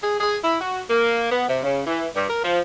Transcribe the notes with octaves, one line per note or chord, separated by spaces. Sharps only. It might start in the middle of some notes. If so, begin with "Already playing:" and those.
G#4
G#4
E4
F#4
A#3
B3
C3
C#3
E3
G2
A#4
F3